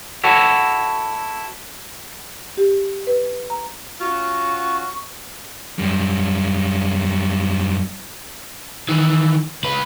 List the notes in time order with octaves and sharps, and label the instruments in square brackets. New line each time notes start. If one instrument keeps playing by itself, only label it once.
[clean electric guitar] E4 F#4 A4 C#5
[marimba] G4
B4
A#5
[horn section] C#4 F4 F#4 [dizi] C#6
[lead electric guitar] F#2 G3
[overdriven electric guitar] D#3 E3
C#2 B4